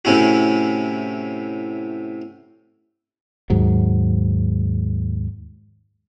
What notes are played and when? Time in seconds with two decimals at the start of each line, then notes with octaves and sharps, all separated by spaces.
0.05 A2 C3 C#4 E4 F#4
3.50 D#2 G#2 F#3